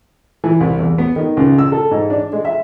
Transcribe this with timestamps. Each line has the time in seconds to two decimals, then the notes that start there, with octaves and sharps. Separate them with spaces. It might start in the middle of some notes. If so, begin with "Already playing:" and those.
0.44 E3
0.60 C2
0.79 E2
0.98 B3
1.16 D#3
1.37 C#2
1.58 E6
1.72 A4
1.91 G#2
2.10 D4
2.33 G#3
2.45 E5